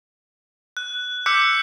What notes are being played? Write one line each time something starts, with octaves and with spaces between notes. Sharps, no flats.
F#6
D6 E6 F#6 G6 B6 C#7